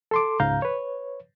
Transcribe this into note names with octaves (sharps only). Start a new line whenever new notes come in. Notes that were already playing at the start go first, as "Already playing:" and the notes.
A4 C6 D6
C#2 G#2 F5 A#5 G6
B4 C#5